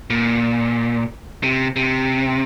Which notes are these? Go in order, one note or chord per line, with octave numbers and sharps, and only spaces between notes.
A#2
C3
C3